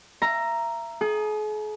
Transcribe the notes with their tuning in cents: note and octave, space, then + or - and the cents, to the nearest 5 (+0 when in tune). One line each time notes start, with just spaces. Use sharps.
E5 +30 A#5 +0
G#4 +45 D#6 +0